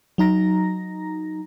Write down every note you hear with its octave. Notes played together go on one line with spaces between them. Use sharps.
F#3 D#4 A#5 A#6